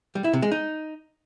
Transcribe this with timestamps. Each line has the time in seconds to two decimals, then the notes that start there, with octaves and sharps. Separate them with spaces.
0.15 G3
0.24 E4
0.33 C3
0.42 G#3
0.51 D#4